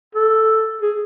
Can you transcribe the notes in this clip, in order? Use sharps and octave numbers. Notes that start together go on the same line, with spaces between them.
A4
G#4